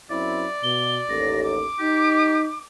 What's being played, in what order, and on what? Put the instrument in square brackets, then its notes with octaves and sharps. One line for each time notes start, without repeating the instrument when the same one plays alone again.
[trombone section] F#2 C4 E4 [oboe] D5
[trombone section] B2 [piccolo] G7
[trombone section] A1 D#2 [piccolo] A#6
[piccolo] D6
[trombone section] D#4 [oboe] G4